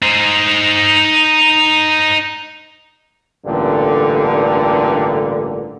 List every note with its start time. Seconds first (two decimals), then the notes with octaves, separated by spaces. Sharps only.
0.02 D#4 C5
3.46 A1 G2 A#2 D3